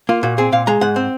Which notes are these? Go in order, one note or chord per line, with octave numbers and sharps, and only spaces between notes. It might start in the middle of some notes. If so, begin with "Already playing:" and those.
A#3 F4
A#2 F#4
C4 G#4
A#2 F5
G#3 A#5
G#2 F#5
C4